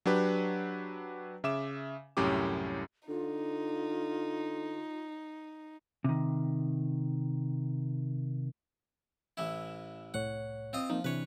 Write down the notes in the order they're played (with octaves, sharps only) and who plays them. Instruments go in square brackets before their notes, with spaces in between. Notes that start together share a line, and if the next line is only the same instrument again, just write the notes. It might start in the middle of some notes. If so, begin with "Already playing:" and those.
[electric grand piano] F#3 D4 G4 B4
C#3 E5 D6 E7
C2 F#2 A2 C#4 G4 D6
[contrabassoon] D3 [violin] D#4 [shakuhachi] F4
[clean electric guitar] C3 D#3
[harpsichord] A1 E3 E4
[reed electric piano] C2 A2 C#5 [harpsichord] F#5
[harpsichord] C4 F4 D#5
[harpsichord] F3 [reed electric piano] A#3 C4 D#4
[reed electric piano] C3 E3 D4 [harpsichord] B4 C#5